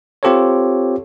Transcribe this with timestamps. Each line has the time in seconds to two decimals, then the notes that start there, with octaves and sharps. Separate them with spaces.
0.23 C4 F4 G4 A4 C5 C#5